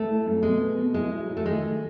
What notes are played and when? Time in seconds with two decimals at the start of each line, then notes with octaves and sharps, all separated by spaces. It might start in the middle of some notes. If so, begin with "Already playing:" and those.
Already playing: A3
0.09 E4
0.26 F#2
0.43 B2 G#3
0.60 B3
0.77 B2
0.94 G#3 E4
1.11 F#3
1.28 E4
1.37 A3
1.46 D#3 G#3
1.63 D#3